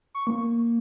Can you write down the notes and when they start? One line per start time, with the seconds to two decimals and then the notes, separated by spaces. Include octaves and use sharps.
0.15 C#6
0.27 A#3